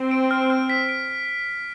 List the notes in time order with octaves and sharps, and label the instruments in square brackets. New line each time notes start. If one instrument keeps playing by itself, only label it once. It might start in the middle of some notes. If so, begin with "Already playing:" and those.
Already playing: [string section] C4
[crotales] D7
F6
F6
B6
D7